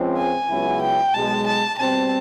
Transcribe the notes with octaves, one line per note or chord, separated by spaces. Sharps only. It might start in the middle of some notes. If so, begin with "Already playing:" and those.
Already playing: C#2 C#3 F3 G#3 C4
G#5
C#2 C#3 F#3 B3 E4
G5
B1 B2 G#3 A5
A5
B2 G3 C4 A5